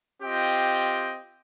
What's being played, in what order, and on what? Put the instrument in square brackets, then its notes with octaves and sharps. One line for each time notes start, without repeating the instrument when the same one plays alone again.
[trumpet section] C4 F4 G4 D#5 G5